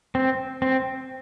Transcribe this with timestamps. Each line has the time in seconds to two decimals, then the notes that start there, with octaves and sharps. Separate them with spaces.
0.15 C4
0.62 C4